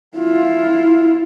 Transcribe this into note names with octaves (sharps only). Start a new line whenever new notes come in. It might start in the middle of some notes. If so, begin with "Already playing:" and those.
E4 F4